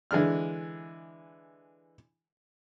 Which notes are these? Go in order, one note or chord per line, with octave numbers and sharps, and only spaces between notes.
D3 E3 G#3 D4 F6